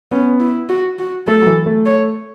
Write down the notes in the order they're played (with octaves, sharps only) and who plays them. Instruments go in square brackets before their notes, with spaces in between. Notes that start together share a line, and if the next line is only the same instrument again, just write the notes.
[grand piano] B3 [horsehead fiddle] C#4
[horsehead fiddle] E4
F#4
F#4
[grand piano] A3 [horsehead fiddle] A4
[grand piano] F#3
E3
A3
[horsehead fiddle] C#5